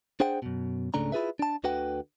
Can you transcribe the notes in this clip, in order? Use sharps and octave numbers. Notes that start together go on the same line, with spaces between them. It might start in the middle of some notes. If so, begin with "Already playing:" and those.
D4 G#4 C5 F#5 G5
F#2 B2
C#2 G#2 C#3 A3 D4 A#5
E4 F4 G#4 B4 E5
D4 A5
D2 D3 F#4 B4 F#5 G5